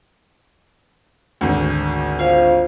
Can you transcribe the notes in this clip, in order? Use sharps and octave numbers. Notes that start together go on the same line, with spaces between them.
G#1 D2
F4 C5 F5